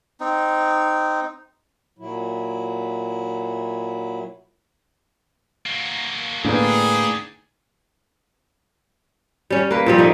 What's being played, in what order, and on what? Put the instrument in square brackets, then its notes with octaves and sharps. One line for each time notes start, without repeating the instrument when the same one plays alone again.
[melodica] C4 D#4
[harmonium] A#2 F#3 E4
[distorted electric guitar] A#3 F#4
[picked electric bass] A2 [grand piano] D3 A#3 B3 [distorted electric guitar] D4 G5 [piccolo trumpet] G#4
[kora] G3 C#4
A#3 B4
A#2 F3 G3
A3 A#3 D#4